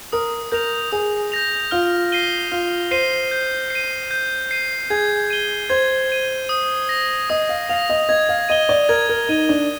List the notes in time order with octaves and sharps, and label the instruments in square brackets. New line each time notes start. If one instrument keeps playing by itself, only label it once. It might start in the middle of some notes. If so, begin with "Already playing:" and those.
[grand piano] A#4 [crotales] D#6
[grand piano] A#4 [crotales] G6 A#6 F7
[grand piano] G#4 [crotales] D#6
[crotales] G6 A#6 F7
[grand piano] F4 [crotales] F6
[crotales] C7 D#7 G7
[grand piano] F4 [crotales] F6
[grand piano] C5 [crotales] C7 D#7 G7
[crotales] G6
C7 D#7
G6
C7 D#7
[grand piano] G#4 [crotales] G#6
[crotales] D#7 G7
[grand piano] C5 [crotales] G#6
[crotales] D#7 G7
D#6
A#6 F7
[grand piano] D#5 [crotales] D#6
[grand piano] F5
[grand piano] F5 [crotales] A#6 F7
[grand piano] D#5
[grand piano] D#5 [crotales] G#6
[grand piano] F5
[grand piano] D#5 [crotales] D#7 G7
[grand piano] D5
[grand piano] A#4 [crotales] G#6
[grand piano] A#4
[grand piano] D#4 [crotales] D#7 G7
[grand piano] D4